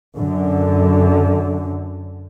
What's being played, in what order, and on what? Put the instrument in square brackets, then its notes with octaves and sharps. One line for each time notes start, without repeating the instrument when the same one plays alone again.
[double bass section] F#2 D3